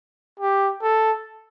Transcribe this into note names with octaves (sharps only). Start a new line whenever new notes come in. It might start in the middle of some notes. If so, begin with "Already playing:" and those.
G4
A4